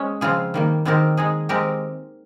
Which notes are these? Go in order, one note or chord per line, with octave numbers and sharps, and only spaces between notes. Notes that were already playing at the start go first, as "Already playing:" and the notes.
Already playing: G#3 C#4
C#3 F3 C4 F4 G#4
D#3 G3 A#3
D#3 G#3 C4 G4 A#4
G#3 D#4 G#4
G#3 C4 G4 A#4